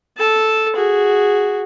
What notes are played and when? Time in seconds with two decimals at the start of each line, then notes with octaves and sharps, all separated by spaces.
0.18 A4 A5
0.75 F#4 G#4